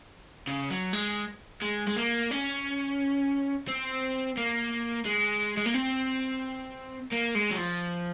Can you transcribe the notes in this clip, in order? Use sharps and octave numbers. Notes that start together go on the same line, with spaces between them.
C#3
F#3
G#3
G#3
G#3
A#3
C#4
C4
A#3
G#3
G#3
A#3
C4
A#3
G#3
F#3
F3